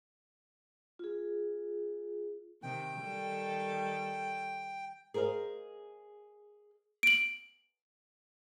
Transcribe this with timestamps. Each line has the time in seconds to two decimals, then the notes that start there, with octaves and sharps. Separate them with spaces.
0.99 F4 G#4
2.63 C3 D#3 G5
2.99 D#3 G3 A4
5.14 G#4 A#4 C5 D#5 F5
7.03 D7 F#7